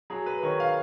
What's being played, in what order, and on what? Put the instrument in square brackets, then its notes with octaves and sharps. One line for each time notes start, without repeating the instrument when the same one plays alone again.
[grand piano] F#3 G#4
B4
D#3 C#5
F5